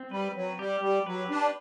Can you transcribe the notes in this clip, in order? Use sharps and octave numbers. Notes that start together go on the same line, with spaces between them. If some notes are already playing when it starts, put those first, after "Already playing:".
Already playing: C4
G3 B4
F#3
G3 G4
G3
F#3 B4
D4